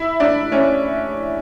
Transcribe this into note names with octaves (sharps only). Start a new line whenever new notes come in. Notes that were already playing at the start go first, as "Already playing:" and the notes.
Already playing: E4
D4
C#4